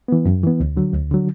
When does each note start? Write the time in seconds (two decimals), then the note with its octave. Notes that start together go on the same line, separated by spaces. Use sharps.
0.08 E3 B3
0.25 F#2
0.43 E3 B3
0.60 D2
0.77 D3 F#3
0.93 D2
1.11 D3 F#3